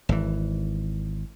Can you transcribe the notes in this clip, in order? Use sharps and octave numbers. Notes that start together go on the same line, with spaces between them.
G#1 E3